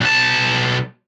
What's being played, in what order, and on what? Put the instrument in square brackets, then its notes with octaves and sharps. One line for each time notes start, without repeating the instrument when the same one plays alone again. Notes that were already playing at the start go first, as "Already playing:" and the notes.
[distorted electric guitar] B1 A5